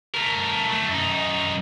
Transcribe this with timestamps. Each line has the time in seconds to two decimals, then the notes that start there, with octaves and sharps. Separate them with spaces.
0.15 A3 A#4
0.70 F#3 A3
0.88 F#2 D#4